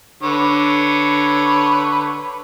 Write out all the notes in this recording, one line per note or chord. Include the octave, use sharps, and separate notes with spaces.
D3 B4 C#5